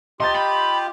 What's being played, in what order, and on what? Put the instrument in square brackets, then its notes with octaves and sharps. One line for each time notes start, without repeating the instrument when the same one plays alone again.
[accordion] F4 G4 [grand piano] D#5 A#5 A6 [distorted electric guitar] C6
[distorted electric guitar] B5